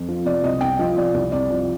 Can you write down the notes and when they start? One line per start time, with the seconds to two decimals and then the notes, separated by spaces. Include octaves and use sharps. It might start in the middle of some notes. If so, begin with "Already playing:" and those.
Already playing: F2
0.09 F3
0.25 C3 D5
0.43 C2 D#5
0.61 C2 G5
0.79 F3 D#5
0.98 C3 D5
1.14 C2
1.32 C2 D5
1.51 F3